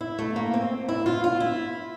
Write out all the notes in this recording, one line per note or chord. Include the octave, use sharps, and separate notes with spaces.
E4
A3
A#3
C4
E4
F4
F4
E4